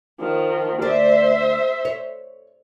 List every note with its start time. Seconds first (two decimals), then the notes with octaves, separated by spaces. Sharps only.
0.20 D#3 F3
0.82 D2 C5 D5 E5
1.85 C#5